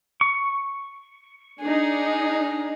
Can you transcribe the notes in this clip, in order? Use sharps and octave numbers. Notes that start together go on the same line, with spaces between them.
C#6
D4 D#4 G#4